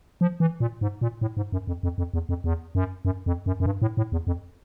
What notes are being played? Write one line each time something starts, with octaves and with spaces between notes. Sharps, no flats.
F3
E3
A#2
G#2
A#2
A2
G#2
F#2
F2
F2
F2
E2
F2
E2
F#2
F#2
F2
F#2
F#2
G2
A2
A2
E2
F2